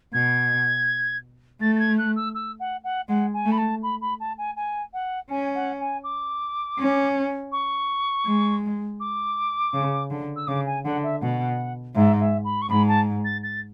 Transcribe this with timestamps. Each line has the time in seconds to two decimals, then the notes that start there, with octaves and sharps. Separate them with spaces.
0.13 B2 G#6
1.61 A3 A6
1.75 A6
1.79 G#6
1.98 F#6
2.16 E6
2.35 E6
2.59 F#5
2.84 F#5
3.08 G#3 F#5
3.33 G#5
3.45 A3
3.51 B5
3.58 A5
3.82 B5
4.01 B5
4.20 A5
4.38 G#5
4.56 G#5
4.93 F#5
5.30 C#4 G#5
5.55 F#5
5.80 G#5
6.03 D6
6.78 C#4
7.52 C#6
8.25 G#3
9.00 D6
9.74 C#3
10.10 D3
10.36 E6
10.47 C#3 D6
10.66 G#5
10.84 D3 F#5
11.03 E5
11.21 B2 F#5
11.95 G#2 E5
12.20 E5
12.44 B5
12.61 C#6
12.69 G#2 B5
12.87 A5
13.24 A6
13.43 A6